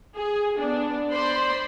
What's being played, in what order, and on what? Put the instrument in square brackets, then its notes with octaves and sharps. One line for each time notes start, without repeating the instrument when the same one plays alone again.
[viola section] G#4
B3 D4
C5 D5 B5 C6